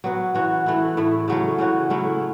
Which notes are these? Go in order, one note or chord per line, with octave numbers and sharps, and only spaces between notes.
F#3 B3 F#4
E3 C#4 F#4
E3 A3 E4
A2 A3 E4
C#3 F#3 A3 C#4
C#3 E3 C#4 F#4
F#3 A3 C#4 E4